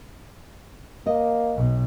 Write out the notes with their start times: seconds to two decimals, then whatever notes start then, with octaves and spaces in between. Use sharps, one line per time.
1.06 A#3 D#5
1.56 B1 B2